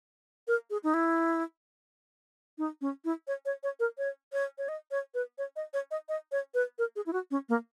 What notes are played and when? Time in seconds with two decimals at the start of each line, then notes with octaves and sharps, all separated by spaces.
0.48 A#4
0.70 G#4
0.84 D#4
0.94 E4
2.58 D#4
2.81 C#4
3.05 E4
3.27 C#5
3.45 C#5
3.63 C#5
3.80 A#4
3.98 C#5
4.33 C#5
4.58 C#5
4.68 D#5
4.91 C#5
5.14 B4
5.38 C#5
5.56 D#5
5.73 C#5
5.91 D#5
6.09 D#5
6.32 C#5
6.54 B4
6.79 A#4
6.96 G#4
7.06 E4
7.13 F#4
7.31 C#4
7.49 A#3